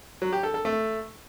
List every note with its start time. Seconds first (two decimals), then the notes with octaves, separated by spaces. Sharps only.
0.22 F#3
0.32 G4
0.43 A4
0.54 A4
0.65 A3